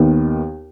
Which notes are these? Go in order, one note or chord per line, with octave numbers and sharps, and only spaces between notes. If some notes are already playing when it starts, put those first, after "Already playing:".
Already playing: D#2 D#3 B3